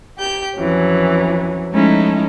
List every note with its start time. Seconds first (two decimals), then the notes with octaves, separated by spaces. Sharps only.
0.18 G4 G6
0.57 F2 E3 F#3 C#4
1.72 F3 G#3 A3 C#4 D#4 E4